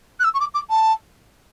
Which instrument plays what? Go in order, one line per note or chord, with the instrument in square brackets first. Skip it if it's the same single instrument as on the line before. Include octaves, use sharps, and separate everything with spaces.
[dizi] F#6
E6
C#6
D6
D6
A5